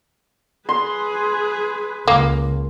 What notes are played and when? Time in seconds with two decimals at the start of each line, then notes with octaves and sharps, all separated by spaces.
0.69 G#4 B4 C6
2.08 C#2 A#3